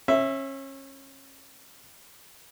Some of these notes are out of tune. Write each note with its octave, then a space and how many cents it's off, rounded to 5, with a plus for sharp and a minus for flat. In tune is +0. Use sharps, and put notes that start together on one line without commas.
C#4 -30 E5 +0